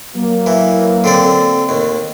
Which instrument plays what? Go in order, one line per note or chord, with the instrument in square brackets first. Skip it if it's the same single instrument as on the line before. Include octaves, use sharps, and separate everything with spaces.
[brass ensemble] F#3 A#3
[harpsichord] E3
D3 C4 D5
D#2